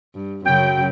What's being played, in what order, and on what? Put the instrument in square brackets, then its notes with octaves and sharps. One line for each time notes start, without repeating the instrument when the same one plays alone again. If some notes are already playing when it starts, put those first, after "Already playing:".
[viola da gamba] G2
[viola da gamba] F#2 C#3 F#3 [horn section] G5